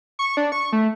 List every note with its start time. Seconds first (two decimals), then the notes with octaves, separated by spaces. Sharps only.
0.19 C#6
0.37 D4
0.52 C#6
0.73 A3